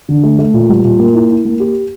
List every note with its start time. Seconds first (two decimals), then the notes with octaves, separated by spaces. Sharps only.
0.09 D3
0.23 A3
0.39 A3
0.54 A#2
0.69 G3
0.84 A#2
0.99 A#3
1.15 E4
1.30 E4
1.45 A#3
1.60 G4